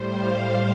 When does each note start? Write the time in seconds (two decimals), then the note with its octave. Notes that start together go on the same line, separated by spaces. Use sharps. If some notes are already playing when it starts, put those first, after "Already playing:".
Already playing: A2 G3 C5
0.18 F5